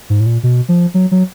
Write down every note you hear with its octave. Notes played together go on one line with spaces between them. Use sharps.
G#2
A2
A#2
B2
F3
F#3
F#3